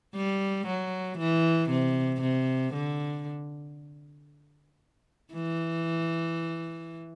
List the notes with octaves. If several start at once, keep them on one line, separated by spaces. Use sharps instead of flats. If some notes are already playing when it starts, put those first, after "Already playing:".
G3
F#3
E3
C3
C3
D3
E3